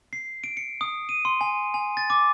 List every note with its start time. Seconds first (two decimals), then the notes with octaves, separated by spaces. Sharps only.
0.13 C7
0.44 D7
0.57 C#7
0.81 D#6
1.09 D#7
1.25 C6
1.41 G#5
1.74 G#5
1.97 A6
2.10 D6